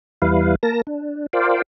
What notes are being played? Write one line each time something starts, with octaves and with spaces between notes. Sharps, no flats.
E2 G3 E4 B4 F5
A#3 A#4 A5 A#6
D4
F4 A#4 C5 D5 F5 G5